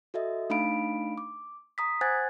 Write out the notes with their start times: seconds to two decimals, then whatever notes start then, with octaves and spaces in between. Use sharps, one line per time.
0.14 F#4 A4 D#5 E5
0.50 A3 D4 D#4 F5 B5 D7
1.18 D6
1.78 A#5 D#6 B6
2.01 C5 F#5 G#5 F#6 G#6 A6